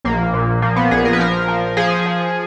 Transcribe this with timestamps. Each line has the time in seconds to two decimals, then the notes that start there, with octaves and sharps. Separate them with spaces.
0.05 A#1 A#3
0.34 A#2
0.62 F3 A#3
0.76 B3
0.91 A#1 G#4
1.05 A#4
1.13 B4
1.19 F3 A#4
1.48 F3
1.77 F3 G#4
2.06 F3